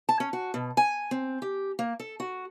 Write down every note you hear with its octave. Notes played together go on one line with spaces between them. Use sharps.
A5
C#4
F#4
B2
G#5
C4
G4
A#3
A4
F#4